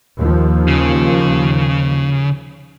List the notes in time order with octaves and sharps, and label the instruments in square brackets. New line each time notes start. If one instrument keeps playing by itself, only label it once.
[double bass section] D#2 D#3 F3
[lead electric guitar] C#3